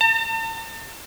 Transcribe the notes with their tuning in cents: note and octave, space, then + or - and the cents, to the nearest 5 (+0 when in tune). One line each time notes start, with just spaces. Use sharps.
A5 +45